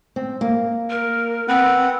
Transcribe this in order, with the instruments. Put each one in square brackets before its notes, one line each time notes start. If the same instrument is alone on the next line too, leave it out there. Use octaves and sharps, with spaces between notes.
[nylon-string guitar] C4
A#3
[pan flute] A#4
[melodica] B3 B4 F#5 [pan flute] C4